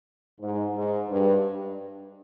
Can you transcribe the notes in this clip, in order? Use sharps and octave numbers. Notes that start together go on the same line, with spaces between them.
G#2
G#2
G2